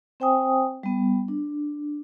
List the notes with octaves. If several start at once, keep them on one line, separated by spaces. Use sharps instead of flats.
C4 C5 G5 G#5 D#6
G3 B3
D4